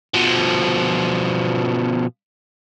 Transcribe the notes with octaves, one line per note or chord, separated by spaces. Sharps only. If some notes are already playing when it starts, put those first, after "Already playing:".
B2 F3